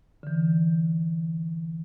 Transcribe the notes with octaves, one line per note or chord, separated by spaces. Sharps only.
D3 E3